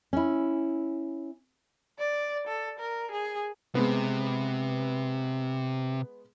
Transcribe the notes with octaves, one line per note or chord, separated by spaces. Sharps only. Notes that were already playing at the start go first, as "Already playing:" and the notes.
C#4 E4
D5
A4
A#4
G#4
C3 G#3 B3